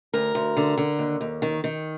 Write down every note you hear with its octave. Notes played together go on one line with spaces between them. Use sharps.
D2 A#4
D2
D3
D3
D#2
D#2
D#3
D#3